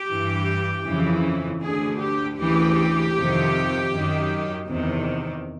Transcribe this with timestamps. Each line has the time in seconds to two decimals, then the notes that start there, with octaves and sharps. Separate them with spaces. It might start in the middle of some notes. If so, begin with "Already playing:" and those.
Already playing: G4
0.09 G2 E3
0.85 F2 C#3 E3
1.62 D2 D3 G#4
2.00 G4
2.38 D2 C#3 E3 G4
3.15 F2 C3 D#3
3.91 F#2 D#3
4.67 E2 C3 D#3